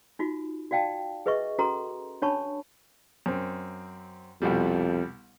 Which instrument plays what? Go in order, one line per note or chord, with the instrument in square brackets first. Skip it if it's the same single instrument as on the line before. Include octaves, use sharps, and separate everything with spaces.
[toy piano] D#4 F4 F#4
F#4 D5 F5 G5 A5
G#4 B4 D#5 E5 C#6
C#4 F#4 A4 B4 A#5 C6
C#4 D4 C#5 A5 B5 C#6
[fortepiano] F#2 C4
[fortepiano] C2 B2 G3 [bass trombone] F2